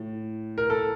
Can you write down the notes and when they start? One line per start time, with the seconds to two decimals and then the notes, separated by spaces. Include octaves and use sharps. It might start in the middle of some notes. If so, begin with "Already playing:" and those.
Already playing: A2
0.58 A#4
0.70 A4